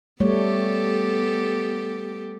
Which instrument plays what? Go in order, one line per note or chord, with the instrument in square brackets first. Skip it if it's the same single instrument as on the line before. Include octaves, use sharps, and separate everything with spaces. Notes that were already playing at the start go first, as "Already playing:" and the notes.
[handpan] G3 A3 C#5 [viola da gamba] B3 G4 A4